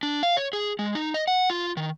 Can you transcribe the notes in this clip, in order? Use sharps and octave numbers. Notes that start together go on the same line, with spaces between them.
D4
F5
C#5
G#4
G#3
D#4
D#5
F#5
F4
D#3